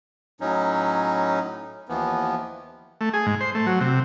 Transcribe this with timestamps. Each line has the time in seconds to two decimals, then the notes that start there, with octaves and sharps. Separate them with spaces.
0.41 A2 F#3 C#4 D#4
1.89 D#2 E3 F3 B3
3.01 A3
3.14 G#4
3.26 G#2
3.41 C5
3.55 A3
3.67 F#3
3.81 C3